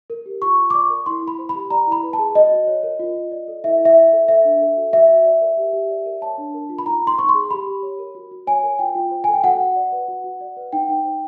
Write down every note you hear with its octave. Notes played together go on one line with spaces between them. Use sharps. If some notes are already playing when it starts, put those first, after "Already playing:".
A#4
G4
F4 C#6
F4
D6
D5 C#6
A#4
E4 C6
E4
B5
C5
B5
G4
D5 A#5
E4
B5
B4
A5
G#4
F#4 D#5
F#4
C#5
A#4
F4
F4
D5
A4
E4 E5
E4
E5
D5
E5
A4
C5 E5
D4
A4
F#4
F#4 E5
F#4
D5
A#4
G4
G4
D5
A#4
C#5 A5
D4
A#4
F4
B5
D#4 A#5
D#4 C6
C5 C#6
C6
G#4
G4 B5
G4
C#5
A#4
F#4
F#4
C#5 G#5
A#4
F4 G5
F4
C5
A4 G#5
G5
F#4 F#5
F#4
D5
B4
F#4
F#4
D5
B4
D#4 G5
D#4
C5